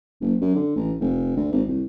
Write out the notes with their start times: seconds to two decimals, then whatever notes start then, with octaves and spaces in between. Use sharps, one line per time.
0.21 F#1
0.41 F#2
0.55 D3
0.76 A1
1.00 F1
1.36 D2
1.52 G#1
1.68 C2